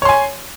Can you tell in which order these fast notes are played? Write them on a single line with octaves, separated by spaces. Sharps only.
C#5 C6 G#5